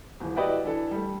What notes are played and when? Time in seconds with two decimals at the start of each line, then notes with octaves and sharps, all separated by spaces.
0.20 D#1 E3
0.36 E4 F#4 G4 B4 D5 D#5
0.64 E3 D4 A4
0.91 G3 A3